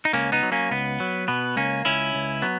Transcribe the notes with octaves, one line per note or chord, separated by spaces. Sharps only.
D#4
C#2 A#3 C#4
B3 D#4
F#3
A#3 C#4
C#2 B3
F#3
B2 B3
C#2 A#3 C#4
C#2 C#4 E4
C#2
F#3 B3